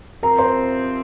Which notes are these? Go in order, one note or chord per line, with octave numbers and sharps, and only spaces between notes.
C3 F3 C4 A#4 A#5
C5 C6